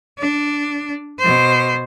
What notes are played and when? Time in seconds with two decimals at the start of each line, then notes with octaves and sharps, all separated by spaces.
0.19 D4
1.19 B2 C5